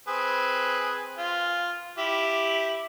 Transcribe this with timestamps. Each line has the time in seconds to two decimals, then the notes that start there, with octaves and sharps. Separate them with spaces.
0.08 C4 G#4 B4
1.17 F4
1.98 E4 G4